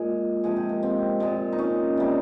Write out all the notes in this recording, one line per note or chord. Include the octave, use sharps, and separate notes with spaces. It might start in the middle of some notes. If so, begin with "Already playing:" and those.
Already playing: A#2 G#3 G#4
C3 F3 G#3 G#4
G4
A#3
C4
A#2 G#3
D#4
C#4
C3 G3